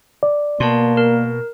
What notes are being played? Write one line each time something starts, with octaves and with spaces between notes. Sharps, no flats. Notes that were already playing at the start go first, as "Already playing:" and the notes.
D5
B2 A#3 A5 C6
A#4